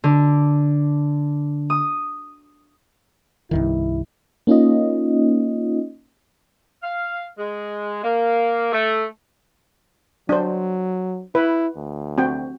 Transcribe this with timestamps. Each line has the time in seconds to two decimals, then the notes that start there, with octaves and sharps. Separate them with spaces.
0.04 D3
1.70 D#6
3.51 C2 G2 D#3 E4
4.47 A#3 C#4 D#4 F4 D#5
6.83 F5
7.38 G#3
8.04 A#3
8.72 A3
10.29 F#3 D4 C5
11.35 E4 B4
11.76 D2
12.18 C4 F#4 G5